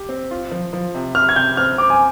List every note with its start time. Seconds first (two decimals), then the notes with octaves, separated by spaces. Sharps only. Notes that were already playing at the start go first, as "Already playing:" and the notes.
Already playing: G4
0.09 C4
0.31 F4
0.51 F3
0.73 F3
0.95 C3
1.15 C3 F6
1.29 G#6
1.36 C3 G6
1.57 C4 F6
1.78 C4 D6
1.90 G#5